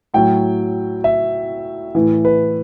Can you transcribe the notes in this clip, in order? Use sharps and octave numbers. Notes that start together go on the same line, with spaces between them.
A2 F#3 G5
E5
A2 E3
B4